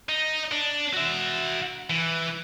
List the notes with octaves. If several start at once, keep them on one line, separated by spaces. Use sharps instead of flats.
D#4
D4
F#4 E5
E3